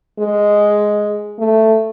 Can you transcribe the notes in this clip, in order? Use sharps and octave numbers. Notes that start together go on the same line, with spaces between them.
G#3
A3